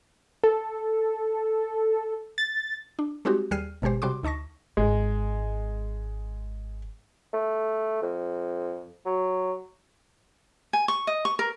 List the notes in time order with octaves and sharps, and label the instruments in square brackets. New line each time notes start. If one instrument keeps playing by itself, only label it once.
[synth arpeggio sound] A4
A6
D4
G3 G#3 C4 D#4 F#4 G4
D#2 G3 G#4 F6 C7 D#7
G#1 B2 G#3 G4 C5
C3 G3 F#4 C6 D6
D2 D#4 A5 C#6 A#6
[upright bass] G#1 [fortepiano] G#3
[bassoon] A3
F2
F#3
[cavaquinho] G#5
C#6
D#5
C#6
A#4